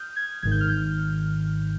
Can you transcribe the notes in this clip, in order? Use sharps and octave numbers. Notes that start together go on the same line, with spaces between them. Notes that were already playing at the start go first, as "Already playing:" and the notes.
Already playing: D#6 F6 G6
G#6
G#1 G#2 D#3 G#6
G6
F6
G6